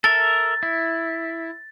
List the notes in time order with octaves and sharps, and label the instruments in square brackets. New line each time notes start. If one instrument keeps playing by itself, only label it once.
[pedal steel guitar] A4 A#4 E5 [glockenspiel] A6
[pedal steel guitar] E4